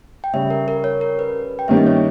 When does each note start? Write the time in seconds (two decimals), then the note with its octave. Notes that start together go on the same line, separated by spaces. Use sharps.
0.24 G5
0.34 C#3 G3 C#4 E5
0.50 A#4
0.68 A#4
0.84 C#5
1.01 A#4
1.19 B4
1.59 G5
1.68 G2 D#3 A#3 C#4 G4 E5
1.77 D#5
1.87 C#5